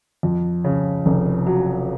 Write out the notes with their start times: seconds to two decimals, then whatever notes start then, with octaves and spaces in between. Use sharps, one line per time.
0.23 F2
0.64 C#3
1.06 F1
1.46 F#3